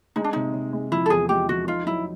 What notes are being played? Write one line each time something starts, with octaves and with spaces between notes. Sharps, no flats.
G#3 D#4
D4
C3 D#4
C3
G#3
F3 E4
A4
E2 G#4
G#3 G4
F3 F#4
D#4 F4
F#3 E4